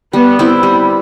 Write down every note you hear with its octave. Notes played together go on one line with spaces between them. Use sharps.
G3 B3
C4 E4
G3